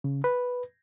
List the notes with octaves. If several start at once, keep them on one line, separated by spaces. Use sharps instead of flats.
C#3
B4